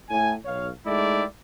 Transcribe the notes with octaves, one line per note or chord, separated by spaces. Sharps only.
A2 G#5
B1 C#5 F5
G#3 A3 D#4 E4 G4 D5